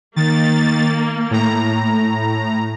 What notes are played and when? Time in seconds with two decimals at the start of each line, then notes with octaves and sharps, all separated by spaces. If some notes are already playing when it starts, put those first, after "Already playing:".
0.16 D#3 A#3 A6
1.31 A2 A#5